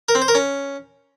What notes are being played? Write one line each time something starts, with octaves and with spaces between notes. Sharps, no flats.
A#4
C4
C5
A#4
C#4